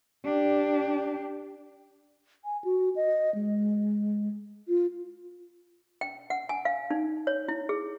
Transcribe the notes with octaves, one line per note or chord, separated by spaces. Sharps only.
D4 G4
G#5
F#4
D#5
G#3
F4
G5
F#5
G#5
F5
D#4
C#5
E4
G#4